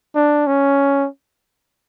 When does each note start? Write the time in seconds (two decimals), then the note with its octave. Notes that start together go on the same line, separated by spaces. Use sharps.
0.15 D4
0.47 C#4